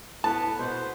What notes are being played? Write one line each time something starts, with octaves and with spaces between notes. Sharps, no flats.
A2 B3 A5
B2 B3 C5